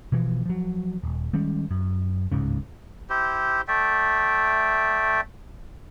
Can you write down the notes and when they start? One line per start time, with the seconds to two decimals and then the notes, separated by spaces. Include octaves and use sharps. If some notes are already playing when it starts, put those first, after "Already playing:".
0.12 B2 E3 F3
0.46 F3 F#3
1.03 D#1
1.33 D#3 G3 G#3 C#4
1.71 F#2
2.32 D1 C#2 G#2 C#3
3.10 E4 G4 C5
3.68 A3 D5 E5 G5